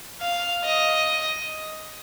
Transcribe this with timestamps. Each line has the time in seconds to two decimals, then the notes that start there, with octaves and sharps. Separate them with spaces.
0.21 F5
0.65 D#5